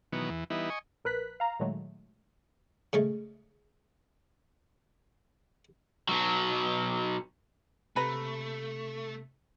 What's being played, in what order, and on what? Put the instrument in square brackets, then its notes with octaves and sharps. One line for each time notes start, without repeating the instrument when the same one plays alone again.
[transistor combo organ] B2 D#3 E3 F#3 B3
E2 E3
E3 G3 B3 D#4 E4
D#5 G#5 C#6
[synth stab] A#1 A#4 B4 F#6 B6
F5 A#5
A#2 D#3 F#3 G#3 A3
[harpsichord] C#3 G#3 A3
[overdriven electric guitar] B2 F#3
[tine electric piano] C3 [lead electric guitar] A3 [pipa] B4 A#5